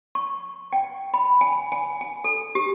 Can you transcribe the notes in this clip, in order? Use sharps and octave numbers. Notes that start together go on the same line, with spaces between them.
C#6
G5
B5
G#5
G#5
G#5
A4
G4